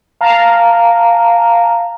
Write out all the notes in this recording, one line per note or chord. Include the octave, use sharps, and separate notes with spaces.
F5 A5 A#5